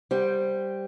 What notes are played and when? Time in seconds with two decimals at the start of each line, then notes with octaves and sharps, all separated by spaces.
0.11 G3 C5 G5